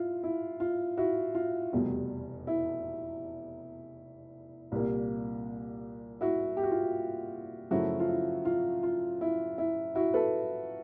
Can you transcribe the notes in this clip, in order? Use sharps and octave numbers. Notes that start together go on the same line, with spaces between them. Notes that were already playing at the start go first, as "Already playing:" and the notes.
Already playing: E4 F4
E4
F4
E4 F#4
F4
F1 E2 B2 G3
E4
C2 A#2 G3 A#3
E4 F#4
G4
F#4
F4
F#2 C#3 F3 A3 E4 F#4
F4
E4
F4
F4
E4
E4
E4 F#4
A4 B4